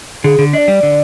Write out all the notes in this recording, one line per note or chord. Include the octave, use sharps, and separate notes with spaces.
D3 G#4
D3
D4 D5 D#5
G3
D3